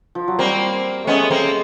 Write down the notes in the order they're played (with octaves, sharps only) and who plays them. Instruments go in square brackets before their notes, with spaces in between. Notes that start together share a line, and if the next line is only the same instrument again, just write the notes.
[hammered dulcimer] F3
F#3
[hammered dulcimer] G3 [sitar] A#3 C4
[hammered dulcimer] G#3 A3 [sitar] B3 C#4
[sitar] A#3 C4